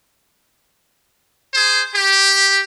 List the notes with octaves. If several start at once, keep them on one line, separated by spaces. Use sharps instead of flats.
G#4 C5
G4